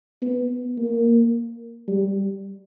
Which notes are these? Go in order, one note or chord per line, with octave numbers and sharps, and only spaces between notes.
B3
A#3
G3